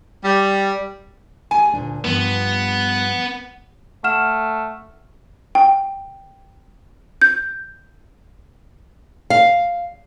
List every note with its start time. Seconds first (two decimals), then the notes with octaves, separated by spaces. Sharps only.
0.23 G3
1.51 A3 G4 G#4 G#5
1.73 D2 A#2 D4
2.04 G2 F3 B3 G4
4.04 A3 F#5 F6 E7
5.55 G5
7.21 G6
9.30 F5